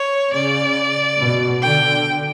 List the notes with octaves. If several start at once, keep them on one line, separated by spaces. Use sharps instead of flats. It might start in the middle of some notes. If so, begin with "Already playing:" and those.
Already playing: C#5
C#3 D5
B2
D3 G5